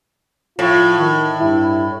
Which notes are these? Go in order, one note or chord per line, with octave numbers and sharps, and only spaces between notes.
A2 F3 F4
D#3
G2 E4